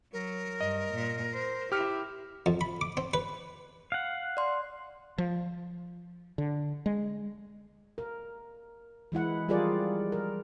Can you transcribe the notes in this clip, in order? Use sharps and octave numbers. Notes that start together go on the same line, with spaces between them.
F#3 A#4
G2 D#5
A#2
C5
E4 G4 F6
F2
B5
D6
C4
B4
F5 F#5
D5 C6
F3
D3
G#3
A#4
E3 G#3 E4 F#5
F3 G3 F4 G#4 A#4 D5
A#4